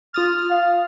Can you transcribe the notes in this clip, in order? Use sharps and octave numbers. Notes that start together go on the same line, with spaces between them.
F4 D#6 F6 A6
F5